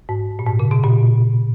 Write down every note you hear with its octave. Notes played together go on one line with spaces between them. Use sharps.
G#2
A#2
G#2
C#3
B2
A#2